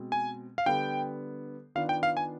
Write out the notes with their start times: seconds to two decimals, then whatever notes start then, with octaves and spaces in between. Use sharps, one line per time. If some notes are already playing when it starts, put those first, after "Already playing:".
Already playing: B2 G#3 C4
0.12 G#5
0.58 F5
0.66 D3 G3 B3 G5
1.75 D#3 B3 D4 F4 F5
1.89 G5
2.03 F5
2.17 G#5